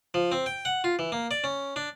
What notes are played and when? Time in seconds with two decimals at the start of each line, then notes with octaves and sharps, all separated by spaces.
0.14 F3
0.32 C4
0.46 G5
0.65 F#5
0.84 F4
0.99 E3
1.12 A#3
1.31 D5
1.44 C#4
1.76 D4